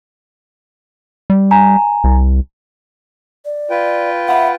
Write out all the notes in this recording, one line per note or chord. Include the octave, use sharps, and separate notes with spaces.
G3
G#5 A#5
C2
D5
F4 B4 G5
E5 F#5 B5